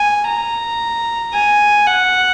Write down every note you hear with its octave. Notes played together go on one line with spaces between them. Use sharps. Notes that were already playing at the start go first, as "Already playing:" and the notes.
Already playing: G#5
A#5
G#5
F#5